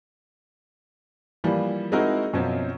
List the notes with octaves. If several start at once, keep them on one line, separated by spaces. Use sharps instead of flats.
E3 F3 G3 A#3
G#3 C4 D#4 E4 F#4 A#4
F#2 B2 F3 F#3 C4 C#4